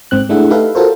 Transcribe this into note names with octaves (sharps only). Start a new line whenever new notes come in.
G#2 C4 F#6
A3 D4 E4 G#4 E5 F#5
D#4 G4 A4 B4 E5 F5
F4 F#4 A4 A#4 C5 C#5